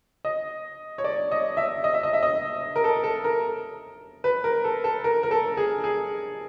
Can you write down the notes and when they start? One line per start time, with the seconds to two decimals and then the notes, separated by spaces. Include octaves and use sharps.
0.25 D#5
0.98 C#5
1.04 D5
1.32 D#5
1.57 E5
1.84 D#5
1.94 E5
2.03 D#5
2.13 E5
2.23 D#5
2.76 A#4
2.84 A4
3.04 A4
3.24 A#4
4.24 B4
4.44 A#4
4.64 A4
4.84 A4
5.04 A#4
5.23 A#4
5.31 A4
5.57 G#4
5.84 G#4